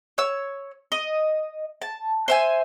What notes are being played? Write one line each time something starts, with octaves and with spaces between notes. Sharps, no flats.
C#5 E6
D#5
A5
C5 E5 G#5